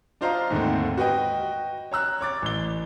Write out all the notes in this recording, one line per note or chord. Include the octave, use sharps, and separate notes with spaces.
D4 F4 C5 D#5 F5 A#5
D#2 G#2 D3 A3 C4
F#4 B4 D#5 G5
C#5 A#5 E6 F#6
C#5 D6 A6
A1 G7